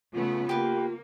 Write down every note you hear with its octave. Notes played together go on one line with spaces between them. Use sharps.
C#3 A3 B3 F4
A#3 G4 B4